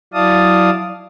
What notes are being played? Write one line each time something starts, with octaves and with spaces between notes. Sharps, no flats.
F#3 E4 D5 F5 A5 D#6